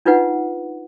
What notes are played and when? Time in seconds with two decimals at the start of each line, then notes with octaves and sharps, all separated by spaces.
0.06 D4 D#4 F4 B4 F#5